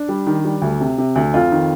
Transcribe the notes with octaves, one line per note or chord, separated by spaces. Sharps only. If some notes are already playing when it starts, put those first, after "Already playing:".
Already playing: D4
G3
D#3
G3
D2
C3
C3
D2
F2 F4
D#3